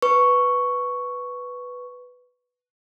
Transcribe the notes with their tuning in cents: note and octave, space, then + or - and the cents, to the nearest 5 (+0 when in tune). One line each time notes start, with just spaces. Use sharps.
B4 +0 C#6 +0